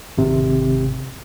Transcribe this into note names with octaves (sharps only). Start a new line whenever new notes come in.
G#1 C3